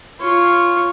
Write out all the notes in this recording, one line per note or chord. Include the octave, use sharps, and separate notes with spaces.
F4 C#5